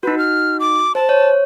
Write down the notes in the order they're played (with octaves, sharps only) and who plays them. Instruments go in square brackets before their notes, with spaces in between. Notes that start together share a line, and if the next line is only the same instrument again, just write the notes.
[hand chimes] D#4 F#4 [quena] B4
[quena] F6
D6
[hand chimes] C5 [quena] A5
[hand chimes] C#5